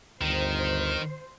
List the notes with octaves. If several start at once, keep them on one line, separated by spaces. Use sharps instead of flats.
G1 D2 D#3 C5